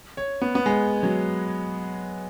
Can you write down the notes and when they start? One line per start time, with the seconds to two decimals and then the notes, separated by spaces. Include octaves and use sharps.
0.17 C#5
0.42 B3
0.55 B3
0.66 G#3
1.03 F#3